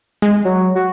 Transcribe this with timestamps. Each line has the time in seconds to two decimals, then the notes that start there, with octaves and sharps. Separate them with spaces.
0.22 G#3
0.45 F#3
0.75 F#4